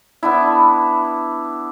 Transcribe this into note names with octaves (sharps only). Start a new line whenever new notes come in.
B3 D4 E4